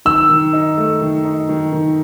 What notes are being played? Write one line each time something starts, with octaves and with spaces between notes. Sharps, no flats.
D#3 E6
D#3
D#4
A3
D#3
D#4
D#3
D#3